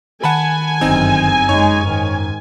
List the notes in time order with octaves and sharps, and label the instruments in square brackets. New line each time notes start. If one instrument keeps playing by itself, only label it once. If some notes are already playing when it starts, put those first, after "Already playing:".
[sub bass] D#3 [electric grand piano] F#5 A5 B5 [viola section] G#5
[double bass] G1 F#2 [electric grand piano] C4 D#4
[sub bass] F#2 [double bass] G#3 D#4 [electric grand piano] C#5
[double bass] G#2 D#3